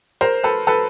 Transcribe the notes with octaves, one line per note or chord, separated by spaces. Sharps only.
A#4 C5
A4 B4
A4 B4